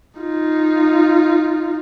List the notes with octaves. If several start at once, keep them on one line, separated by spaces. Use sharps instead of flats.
D#4 F4